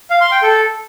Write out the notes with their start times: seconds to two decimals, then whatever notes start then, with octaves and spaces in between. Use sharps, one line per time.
0.10 F5
0.21 C6
0.32 G5
0.42 A4